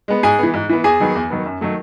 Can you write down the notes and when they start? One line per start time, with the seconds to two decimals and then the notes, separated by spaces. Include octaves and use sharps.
0.08 G#3 B3
0.23 G#2 G#4 G#5
0.39 E3 B3
0.54 G#2
0.69 E3 B3
0.84 E2 G#4 G#5
1.00 D#3 F#3 B3
1.15 E2
1.30 D#3 F#3 B3
1.45 F#2
1.61 D#3 F#3 A3